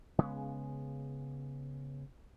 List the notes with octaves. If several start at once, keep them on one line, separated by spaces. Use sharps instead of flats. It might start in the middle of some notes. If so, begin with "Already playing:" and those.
C#3 G#3 B3